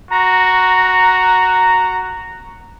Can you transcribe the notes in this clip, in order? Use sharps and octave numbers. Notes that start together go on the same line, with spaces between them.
F#4 A#5